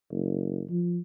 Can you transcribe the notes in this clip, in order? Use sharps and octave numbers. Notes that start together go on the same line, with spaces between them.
F#1
F3